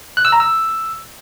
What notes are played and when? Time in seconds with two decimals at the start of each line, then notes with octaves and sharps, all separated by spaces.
0.17 F#6
0.25 E6
0.32 A#5
0.40 E6